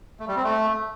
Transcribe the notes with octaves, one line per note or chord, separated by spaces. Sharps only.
A3
G3
C4
A3